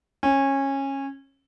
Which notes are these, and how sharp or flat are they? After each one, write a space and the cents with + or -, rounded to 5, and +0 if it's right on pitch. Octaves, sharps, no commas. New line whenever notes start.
C#4 -20